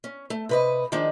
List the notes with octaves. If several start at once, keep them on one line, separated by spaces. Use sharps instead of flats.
C#4
A3
C3 B4 D#5
D#3 F3 G#3 D4